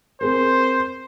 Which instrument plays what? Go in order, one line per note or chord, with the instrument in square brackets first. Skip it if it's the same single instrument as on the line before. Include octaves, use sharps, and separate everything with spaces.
[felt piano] C4 G#4 A#4 [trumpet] C5